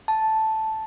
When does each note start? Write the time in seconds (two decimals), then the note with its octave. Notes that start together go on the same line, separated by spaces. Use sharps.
0.08 A5